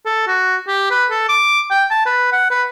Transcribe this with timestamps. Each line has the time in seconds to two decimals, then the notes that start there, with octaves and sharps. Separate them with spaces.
0.06 A4
0.28 F#4
0.68 G4
0.91 B4
1.11 A4
1.29 D6
1.71 G5
1.91 A5
2.06 B4
2.33 F#5
2.51 B4